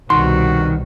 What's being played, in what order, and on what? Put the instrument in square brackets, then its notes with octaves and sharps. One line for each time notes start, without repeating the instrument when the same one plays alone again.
[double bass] C2 B2 [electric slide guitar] D#3 [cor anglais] F#4 [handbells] C6